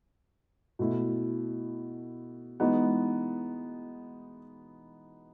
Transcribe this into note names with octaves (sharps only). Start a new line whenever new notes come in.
B2 A3 E4
E3 G#3 B3 D#4 F#4